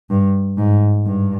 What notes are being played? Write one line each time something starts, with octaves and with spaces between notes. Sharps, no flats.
G2
G#2
G2